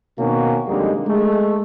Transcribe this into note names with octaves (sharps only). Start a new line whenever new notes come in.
B2 D#3 A#3 C4 C#4 F#4
F2 D3 G3 G#3 A#3 D#4
G#3 A3